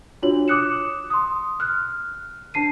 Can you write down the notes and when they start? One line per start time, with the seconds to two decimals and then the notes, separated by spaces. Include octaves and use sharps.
0.23 D4 F4 F#4 C#5 F#7
0.48 D6 D#6 F#6 C#7 E7
1.10 C6 D#6
1.60 F6 F#6
2.54 D4 A5 C7 D#7